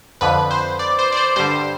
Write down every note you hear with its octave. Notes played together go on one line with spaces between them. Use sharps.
F2 D3 F3 B4
C5
D5
C5
D5
C5
G2 D3 G3 C5